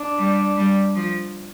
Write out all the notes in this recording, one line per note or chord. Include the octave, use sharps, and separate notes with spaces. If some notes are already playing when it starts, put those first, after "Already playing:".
Already playing: D4
G3
G3
F3